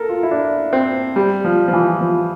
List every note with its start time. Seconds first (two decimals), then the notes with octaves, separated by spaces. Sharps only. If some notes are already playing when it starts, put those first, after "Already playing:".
Already playing: A4 A#4
0.09 F4
0.23 E4
0.31 D4
0.73 C4
1.16 G3
1.44 F3
1.68 F3
1.73 E3
2.01 F3